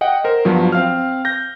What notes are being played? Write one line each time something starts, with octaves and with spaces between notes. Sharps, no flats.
D#5 F#5 G5
A#4 C5
G2 F3 F#3 B3
C4 F5 F6
G6 A#6